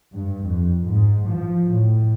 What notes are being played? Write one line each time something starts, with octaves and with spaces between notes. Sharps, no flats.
G2
F2
G#2
F3
A2